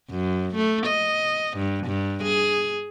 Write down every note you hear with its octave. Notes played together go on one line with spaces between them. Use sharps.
F#2
A3
D#5
G2
G2
G#4